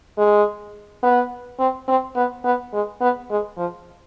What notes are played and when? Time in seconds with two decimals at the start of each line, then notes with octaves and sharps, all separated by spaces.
0.17 G#3
1.03 B3
1.59 C4
1.88 C4
2.16 B3
2.44 B3
2.73 G#3
3.01 B3
3.30 G#3
3.58 F3